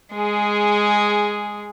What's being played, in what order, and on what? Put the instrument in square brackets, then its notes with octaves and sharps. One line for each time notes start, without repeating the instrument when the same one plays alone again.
[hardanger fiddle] G#3 G#4